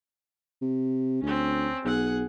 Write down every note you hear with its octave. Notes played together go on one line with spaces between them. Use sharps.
C3
D2 C4 C#4
B1 G#4 F#5